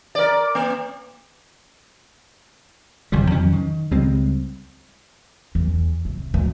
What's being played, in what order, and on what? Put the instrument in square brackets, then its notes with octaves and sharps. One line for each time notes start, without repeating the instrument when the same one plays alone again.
[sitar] A#4 D5
A#3
[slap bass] G1 F2 C3 G3
F2 D#3 F#3 C#4
D#3
C#2 G3 G#3 C4
[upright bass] E2
C3
D2